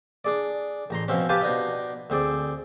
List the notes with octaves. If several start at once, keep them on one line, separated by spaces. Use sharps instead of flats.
D4 G#4 D5
A1 A#5 C6
B2 F3 C4 C#4
G4 B4 C5 F5 G#5 A5
B2 D4 D#4
D2 C4 G#4 D5